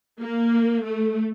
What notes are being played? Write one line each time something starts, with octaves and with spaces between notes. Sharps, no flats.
A#3
A3